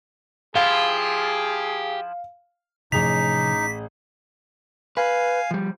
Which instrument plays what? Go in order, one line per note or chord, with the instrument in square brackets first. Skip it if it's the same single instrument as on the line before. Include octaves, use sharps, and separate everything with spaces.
[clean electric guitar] F3 E4 F4 [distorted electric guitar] G4 [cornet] G#4 [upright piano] F5
[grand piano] A1 G#4 F7 [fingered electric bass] C3 F3 [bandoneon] D#4 [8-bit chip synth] B6
[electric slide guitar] B4 [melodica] F5 G#5
[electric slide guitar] F3 G3